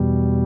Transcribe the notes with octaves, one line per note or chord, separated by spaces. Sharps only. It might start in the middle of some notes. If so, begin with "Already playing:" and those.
Already playing: E2 B2 G3